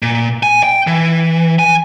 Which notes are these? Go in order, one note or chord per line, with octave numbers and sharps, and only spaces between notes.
A#2
G#5
G5
E3
G#5